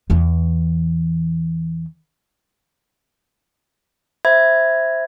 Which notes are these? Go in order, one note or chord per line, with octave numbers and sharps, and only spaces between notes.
E2 E3
C5 E5 B5 G#6